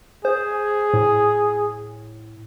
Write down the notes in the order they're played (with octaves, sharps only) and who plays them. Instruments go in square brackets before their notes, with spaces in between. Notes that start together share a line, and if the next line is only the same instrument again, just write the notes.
[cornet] G#4 [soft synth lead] C5
[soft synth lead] A2